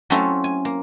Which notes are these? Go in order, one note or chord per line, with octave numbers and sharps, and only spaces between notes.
F#3 A3 C4 C#4 E4 F4
G#5
A#3